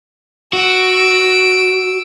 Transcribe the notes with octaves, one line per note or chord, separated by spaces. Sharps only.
F#4 E6 D7